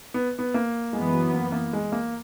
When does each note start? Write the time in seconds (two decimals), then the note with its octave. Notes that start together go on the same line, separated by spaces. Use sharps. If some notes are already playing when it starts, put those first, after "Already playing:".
0.14 B3
0.39 B3
0.54 A#3
0.93 F#2 E3 G#3 B3
1.13 F#3
1.34 A#3
1.52 A#3
1.73 G#3
1.92 A#3